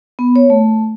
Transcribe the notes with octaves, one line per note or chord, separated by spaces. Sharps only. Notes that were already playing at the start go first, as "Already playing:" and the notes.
B3
C#5
A3